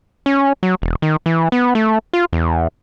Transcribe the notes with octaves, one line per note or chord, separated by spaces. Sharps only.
C#4
F#3
E1
D#3
E3
B3
A3
F4
E2